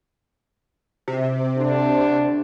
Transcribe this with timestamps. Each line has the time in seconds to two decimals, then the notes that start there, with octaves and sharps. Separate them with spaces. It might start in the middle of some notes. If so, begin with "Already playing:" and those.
1.08 C3
1.56 D2 D4